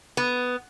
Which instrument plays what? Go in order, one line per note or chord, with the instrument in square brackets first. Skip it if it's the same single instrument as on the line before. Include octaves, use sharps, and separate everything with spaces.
[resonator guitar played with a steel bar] B3